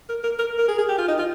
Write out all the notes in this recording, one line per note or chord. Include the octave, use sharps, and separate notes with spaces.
A#4
A#4
A#4
A#4
G#4
G#4
G4
F4
D#4
F4